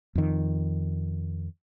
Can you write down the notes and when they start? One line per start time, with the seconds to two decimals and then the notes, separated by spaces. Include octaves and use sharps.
0.15 F2 D#3